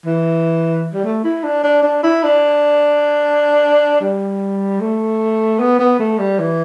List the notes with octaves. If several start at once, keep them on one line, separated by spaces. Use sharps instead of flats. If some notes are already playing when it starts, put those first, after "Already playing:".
E3
G3
A3
E4
D4
D4
D4
E4
D4
G3
A3
B3
B3
A3
G3
E3